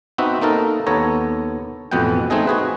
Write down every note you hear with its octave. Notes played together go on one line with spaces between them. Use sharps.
B3 C4 D#4 F#4 E5
A#3 D#4 A4 A#4
D#2 B3 A4 C#5 A#5
A1 F2 B2 B3 F#5 G5
A3 C4 D#4 G#4 D#5
F#4 G#4 B4